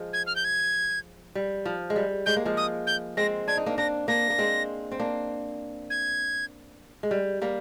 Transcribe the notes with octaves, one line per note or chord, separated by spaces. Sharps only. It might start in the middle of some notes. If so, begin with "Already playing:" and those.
Already playing: F3 G#3
G#6
F6
G6
G#6
G3
F3
G#3
G3
G#3 G6
A#3
F3 G#3
D#6
G6
G#3 C4 A#6
D4 G#6
D#4
A#3 D4
A#3 D4 A#6
A#3 D4 A#6
A#3
G#3 C4
C4
A#3 D4
G#6
G#3
G3
G3 A#3